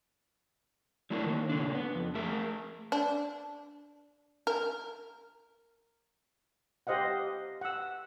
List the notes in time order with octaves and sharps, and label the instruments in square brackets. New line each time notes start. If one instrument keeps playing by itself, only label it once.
[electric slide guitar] F#3 A3 D4 E4 A#4
D#3 A#3
A#2 C#3 D4
B3
F2
A3 G#4 A#4 E5
[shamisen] D4
A#4
[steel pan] G4 C5 D#5 F5 F#5
F#5 E6